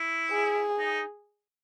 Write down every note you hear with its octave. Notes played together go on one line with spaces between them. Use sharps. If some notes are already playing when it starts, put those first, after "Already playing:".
Already playing: E4
G#4
D#4